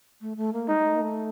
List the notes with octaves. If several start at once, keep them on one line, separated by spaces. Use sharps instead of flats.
A3
A3
A#3
G#3 D#4
G#3
A3
A#3
A3